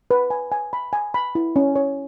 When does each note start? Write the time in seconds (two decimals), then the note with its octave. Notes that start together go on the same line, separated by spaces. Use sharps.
0.11 B4
0.30 G#5
0.52 G#5
0.73 B5
0.93 G#5
1.14 B5
1.35 E4
1.56 C#4
1.76 C#5